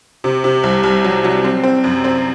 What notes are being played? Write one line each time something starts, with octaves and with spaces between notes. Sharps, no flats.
C3
C3
C2
C2
F#3
F#3
C4
C4
F#2
C4